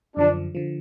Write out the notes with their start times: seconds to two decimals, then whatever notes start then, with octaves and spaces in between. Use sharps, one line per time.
0.16 F#2 D3 F3 D4
0.55 D3 F3